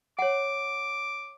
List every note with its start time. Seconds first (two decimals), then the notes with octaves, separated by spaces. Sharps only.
0.19 C#5 F#5 D6